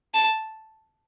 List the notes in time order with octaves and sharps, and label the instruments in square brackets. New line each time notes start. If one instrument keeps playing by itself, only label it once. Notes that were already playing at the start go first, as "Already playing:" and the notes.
[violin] A5